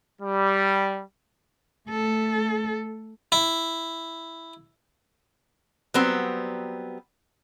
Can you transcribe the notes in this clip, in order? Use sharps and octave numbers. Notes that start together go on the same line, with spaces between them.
G3
A3 A4
E4
F#3 G3 B3 C4